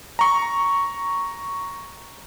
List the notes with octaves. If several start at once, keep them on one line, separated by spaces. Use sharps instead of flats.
A#5 C#6